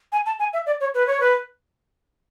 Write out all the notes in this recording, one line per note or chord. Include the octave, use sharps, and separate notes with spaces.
G#5
A5
G#5
E5
D5
C#5
B4
C#5
B4